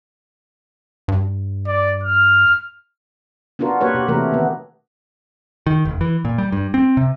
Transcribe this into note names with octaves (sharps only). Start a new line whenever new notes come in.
G2
D5
F6
B3 D4 F4 F#4 A#4
A#3 F#4 G4 B4 C#5
B2 G4
C3 E3 A3 G4 A#4
D#3 B3
D#3
F1
E3
A#2
G3
G2
C4
C3